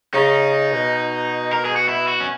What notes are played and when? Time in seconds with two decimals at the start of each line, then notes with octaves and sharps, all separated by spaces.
0.13 C#3 D#4
0.72 B2
1.53 A#4
1.65 G#4
1.76 F#4
1.89 E4
2.08 F#4
2.20 C#4